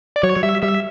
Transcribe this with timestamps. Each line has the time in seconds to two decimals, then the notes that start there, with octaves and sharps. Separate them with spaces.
0.16 D5
0.23 F#3 C#5
0.36 F#3
0.43 G3 E5
0.62 G3 E5